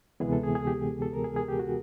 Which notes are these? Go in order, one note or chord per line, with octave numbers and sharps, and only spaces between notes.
D2 C3 E3 G#3 B3 G#4
A4
G#4
G#4
G4
A4
A#4
G#4
G#4
G4
F#4